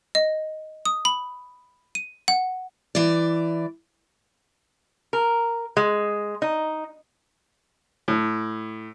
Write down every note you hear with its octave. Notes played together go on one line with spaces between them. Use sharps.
D#5
D#6
B5
D#7
F#5
E3 D5
A#4
G#3
D#4
A2